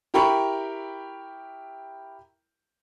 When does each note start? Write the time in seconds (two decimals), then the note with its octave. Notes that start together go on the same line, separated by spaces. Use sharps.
0.14 E4 G4 A#4 G5 B5 C#6